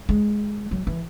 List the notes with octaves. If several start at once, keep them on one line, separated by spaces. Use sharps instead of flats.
G#3
F#3
E3